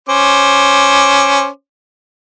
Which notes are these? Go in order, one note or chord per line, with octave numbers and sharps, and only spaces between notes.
C#4 C5 D6